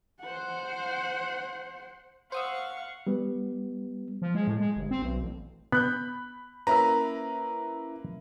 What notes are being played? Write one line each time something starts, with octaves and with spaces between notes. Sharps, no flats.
C5 F#5
C5 F5 F#5 C#6 D#6 E6
G3 B3
F3
G#3
A2
G#3
G1
C4
B1
A1
B3 B5 F#6 G6
A#3 C#4 E4 B4 E5 A#5